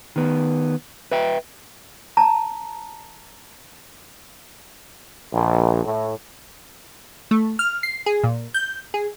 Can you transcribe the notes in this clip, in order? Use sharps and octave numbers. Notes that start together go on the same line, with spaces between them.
D#3 B3
B4 E5 G5
A5 A#5
A#1
A2
A3
F6
C7
G#4
A#2
G6
G#4